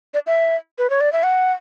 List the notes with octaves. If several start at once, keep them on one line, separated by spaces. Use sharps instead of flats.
D5
E5
B4
C#5
D5
E5
F#5